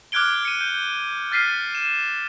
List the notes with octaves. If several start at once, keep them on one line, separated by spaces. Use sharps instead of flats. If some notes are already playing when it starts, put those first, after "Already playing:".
D6 F6 F#6 G#6 D7 G7
C#7 D#7
G6
F6 A6 B6 C7 D#7
E7